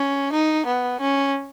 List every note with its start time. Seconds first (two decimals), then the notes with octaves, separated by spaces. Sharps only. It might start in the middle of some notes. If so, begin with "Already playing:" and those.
Already playing: C#4
0.33 D#4
0.66 B3
1.00 C#4